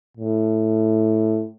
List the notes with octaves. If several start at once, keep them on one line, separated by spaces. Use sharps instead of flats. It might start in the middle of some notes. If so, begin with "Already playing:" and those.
A2